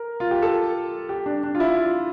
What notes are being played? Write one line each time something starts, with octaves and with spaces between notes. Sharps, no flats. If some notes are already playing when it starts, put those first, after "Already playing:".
Already playing: A#4
F4
G4
A4
G4
D4
D4
F4
E4
F4